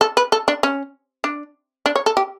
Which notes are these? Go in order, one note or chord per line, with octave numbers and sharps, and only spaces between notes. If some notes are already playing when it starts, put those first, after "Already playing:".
A4
B4
A4
D4
C#4
D4
D4
C#5
A4
G4